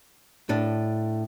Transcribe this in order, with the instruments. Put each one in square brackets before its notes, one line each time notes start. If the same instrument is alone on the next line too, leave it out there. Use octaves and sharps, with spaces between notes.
[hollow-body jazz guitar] A2 D4